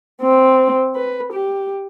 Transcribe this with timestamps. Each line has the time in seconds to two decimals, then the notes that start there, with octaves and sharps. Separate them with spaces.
0.21 C4
0.96 B4
1.33 G4